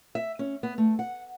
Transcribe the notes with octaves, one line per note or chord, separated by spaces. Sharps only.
E5
C#4
B3
A3
F#5